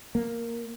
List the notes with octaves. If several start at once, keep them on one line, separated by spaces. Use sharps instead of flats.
A#3